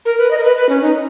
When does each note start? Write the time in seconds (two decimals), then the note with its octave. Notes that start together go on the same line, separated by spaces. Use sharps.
0.05 A#4
0.18 B4
0.31 D#5
0.38 A#4
0.44 B4
0.56 B4
0.69 C#4
0.82 D#4